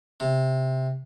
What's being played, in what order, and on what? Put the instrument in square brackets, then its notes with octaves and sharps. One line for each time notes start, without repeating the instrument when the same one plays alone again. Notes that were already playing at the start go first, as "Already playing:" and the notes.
[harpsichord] C3